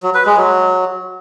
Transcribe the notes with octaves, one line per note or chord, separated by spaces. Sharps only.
F#3
B4
G#3
F#3